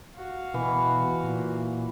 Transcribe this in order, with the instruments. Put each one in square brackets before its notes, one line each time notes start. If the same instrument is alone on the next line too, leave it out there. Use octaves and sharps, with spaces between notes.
[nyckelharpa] F#4 F5
[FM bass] B2 [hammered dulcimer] E3
[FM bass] A#2